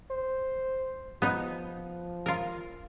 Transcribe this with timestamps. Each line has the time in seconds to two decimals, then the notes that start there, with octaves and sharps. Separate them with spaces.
0.11 C5
1.22 F3 B3 D#4
2.26 F4 A#4